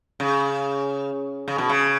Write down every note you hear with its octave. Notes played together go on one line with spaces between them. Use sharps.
C#3
C#3
B2
C#3